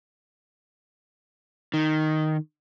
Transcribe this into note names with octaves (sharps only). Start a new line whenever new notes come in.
D#3